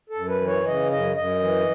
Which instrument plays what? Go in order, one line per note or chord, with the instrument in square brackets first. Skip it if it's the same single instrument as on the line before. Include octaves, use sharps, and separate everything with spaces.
[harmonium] A4
F#2
B4
E3
C#5
C#3 D#5
F#2 D#5
F#2 D#5
E3